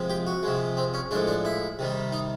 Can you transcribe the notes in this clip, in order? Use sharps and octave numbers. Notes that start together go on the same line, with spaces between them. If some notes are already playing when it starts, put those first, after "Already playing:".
Already playing: C3 F3 G#3
G4
F#4
C3 F3 G#3
C4
C#4
A2 F3 G#3 D4
D4
E4
C3 D#3 G3
D#4